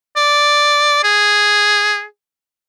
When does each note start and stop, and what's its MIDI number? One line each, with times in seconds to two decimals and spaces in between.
0.16 0.99 74
1.04 2.04 68